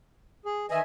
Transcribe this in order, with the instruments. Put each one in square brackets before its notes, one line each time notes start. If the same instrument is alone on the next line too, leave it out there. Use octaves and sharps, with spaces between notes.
[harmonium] G#4
[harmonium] D#3 D#5 [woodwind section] E3 E5 G#5